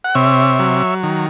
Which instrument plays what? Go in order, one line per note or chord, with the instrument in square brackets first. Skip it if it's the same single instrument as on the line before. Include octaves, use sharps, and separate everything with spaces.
[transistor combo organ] F#5
C3 C#5 E5
F#3
D#3